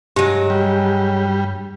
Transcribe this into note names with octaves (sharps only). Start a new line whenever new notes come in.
G2 F#3 G#3 G4
G3